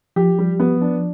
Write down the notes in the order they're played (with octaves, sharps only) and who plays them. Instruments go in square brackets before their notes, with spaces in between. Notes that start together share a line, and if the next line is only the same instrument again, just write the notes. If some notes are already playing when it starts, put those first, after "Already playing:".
[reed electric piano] F3 [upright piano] G4
[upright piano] G3
B3
D4